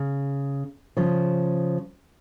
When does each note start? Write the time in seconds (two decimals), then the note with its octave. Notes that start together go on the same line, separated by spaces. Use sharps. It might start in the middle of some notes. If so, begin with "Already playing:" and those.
Already playing: C#3
0.97 C#3 F3